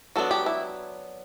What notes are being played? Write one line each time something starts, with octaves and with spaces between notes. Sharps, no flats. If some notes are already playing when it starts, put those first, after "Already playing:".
F#3 B3 D4 A4
G4
E4